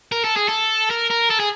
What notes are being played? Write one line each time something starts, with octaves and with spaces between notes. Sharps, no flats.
A#4
A4
G#4
A4
A#4
A#4
A4
G#4